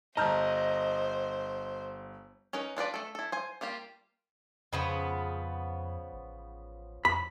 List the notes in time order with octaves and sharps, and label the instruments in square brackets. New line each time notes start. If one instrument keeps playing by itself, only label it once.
[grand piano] G1 A5 [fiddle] C5 [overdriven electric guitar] D#5 [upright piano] A#5 F6 G6
[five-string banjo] C#4 D#4 A#4 B4
D4 F4 B4 D5
A3 A4
E4 A4
C5 G#5
G3 A#3 F4 G4
[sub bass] F2 [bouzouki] C#3 F3 B3
[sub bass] A1
[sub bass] F2 [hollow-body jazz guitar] B5